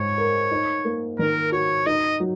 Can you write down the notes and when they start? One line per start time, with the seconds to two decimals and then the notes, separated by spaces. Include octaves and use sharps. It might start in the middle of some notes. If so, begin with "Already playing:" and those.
Already playing: G#2 G#3 C#5
0.18 A#4
0.51 D#4
0.85 A#3
1.18 D#3 A#4
1.52 F#4 C#5
1.86 D#4 D#5
2.20 F#3